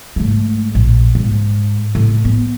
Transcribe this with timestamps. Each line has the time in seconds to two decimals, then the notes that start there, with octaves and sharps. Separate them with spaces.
0.16 G#2 A3
0.75 A#1
1.15 G#2
1.95 A2
2.25 B3